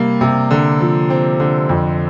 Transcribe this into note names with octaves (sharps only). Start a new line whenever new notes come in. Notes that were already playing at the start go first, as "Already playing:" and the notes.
Already playing: C3 G3 A#3
C3
D3
F3
C4
D3
F2